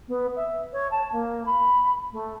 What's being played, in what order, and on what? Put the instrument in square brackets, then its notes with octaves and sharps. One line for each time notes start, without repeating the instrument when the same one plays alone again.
[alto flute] B3
E5
C#5
A5
A#3
B5
A3